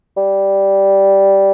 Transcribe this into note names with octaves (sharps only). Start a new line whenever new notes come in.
G3